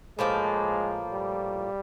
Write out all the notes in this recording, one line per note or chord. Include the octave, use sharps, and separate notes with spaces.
A2 F3 G#3 A#3
G3